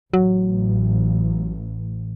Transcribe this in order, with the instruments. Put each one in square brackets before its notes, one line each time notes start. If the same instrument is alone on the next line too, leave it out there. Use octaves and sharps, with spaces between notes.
[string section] A1 [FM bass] F#3